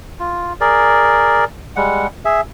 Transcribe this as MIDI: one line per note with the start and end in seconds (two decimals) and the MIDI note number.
0.19 0.53 65
0.61 1.45 68
0.61 1.45 70
0.61 1.45 74
1.76 2.07 55
1.76 2.07 56
1.76 2.07 78
2.25 2.41 68
2.25 2.41 76